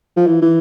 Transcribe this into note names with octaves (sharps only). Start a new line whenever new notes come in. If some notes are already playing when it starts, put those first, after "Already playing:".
F3
E3
E3